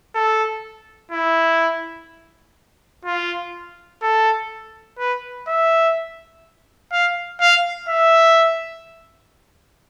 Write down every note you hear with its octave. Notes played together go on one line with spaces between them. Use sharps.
A4
E4
F4
A4
B4
E5
F5
F5
E5